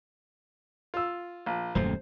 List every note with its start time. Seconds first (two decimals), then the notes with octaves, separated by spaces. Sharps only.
0.94 F4 E6
1.46 A#1
1.75 D#1 F#2 A3 C5